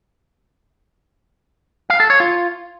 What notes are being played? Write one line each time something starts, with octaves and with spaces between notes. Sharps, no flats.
F5
A4
C#5
F4